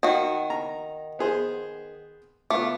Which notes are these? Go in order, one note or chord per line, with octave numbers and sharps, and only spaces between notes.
D#3 F#4
A#5
B3 G#4 C5
A3 B3 F4 D6